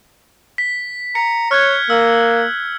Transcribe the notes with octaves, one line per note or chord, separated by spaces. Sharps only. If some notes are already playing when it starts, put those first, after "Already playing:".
B6
A#5 C#7
C#5 F6 F#6 G#6
A#3 E6